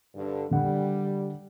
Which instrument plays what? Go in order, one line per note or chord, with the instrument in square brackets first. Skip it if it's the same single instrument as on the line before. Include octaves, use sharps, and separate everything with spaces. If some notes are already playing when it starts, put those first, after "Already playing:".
[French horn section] G2 D3
[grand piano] D3 F#5 [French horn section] G3